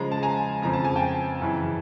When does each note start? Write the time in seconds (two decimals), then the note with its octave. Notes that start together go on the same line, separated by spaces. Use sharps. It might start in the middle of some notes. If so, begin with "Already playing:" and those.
Already playing: C#3 F3 G#3 A#5
0.12 A5
0.23 G#5 A#5
0.62 F2 C#3 F3 A#5
0.73 A5
0.84 G#5
0.96 G5 A5
1.41 F#2 C#3 E3